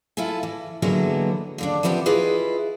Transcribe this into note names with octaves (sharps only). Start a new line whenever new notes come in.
E4 F4 A4 G#5
E3
D3 E3 F#3 G#3 A#3 B3
D#2 D3 D4
E3 F3 B3 C4 G4
E4 F4 G#4 B4 D#5